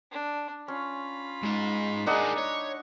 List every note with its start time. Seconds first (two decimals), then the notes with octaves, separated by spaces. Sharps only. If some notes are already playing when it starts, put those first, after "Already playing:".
0.11 D4
0.68 C#4 F4 B5
1.43 G#2 D#4
2.06 A#3 D4 D#4 G#4 F#5
2.38 C#5